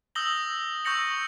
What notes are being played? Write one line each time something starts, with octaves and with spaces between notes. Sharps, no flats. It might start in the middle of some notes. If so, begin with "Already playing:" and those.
D#6 E6 G6 A#6 F#7 G7
C#6 E6 G6 A#6 C#7 F#7